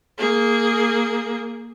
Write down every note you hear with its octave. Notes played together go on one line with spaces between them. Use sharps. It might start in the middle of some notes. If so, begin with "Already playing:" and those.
A#3 G#4